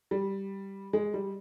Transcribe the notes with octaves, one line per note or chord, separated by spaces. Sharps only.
G3
G#3
G3